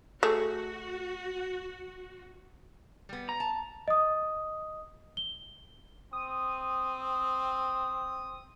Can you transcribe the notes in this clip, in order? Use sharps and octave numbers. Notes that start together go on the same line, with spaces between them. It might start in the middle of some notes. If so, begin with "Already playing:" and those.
A3 F#4 G#4
G3 B3
A#5
A5
D#5 D#6
G7
C4 D#6